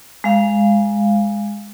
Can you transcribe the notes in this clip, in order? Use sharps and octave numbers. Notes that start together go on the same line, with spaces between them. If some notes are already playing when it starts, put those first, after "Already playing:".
G#3 F5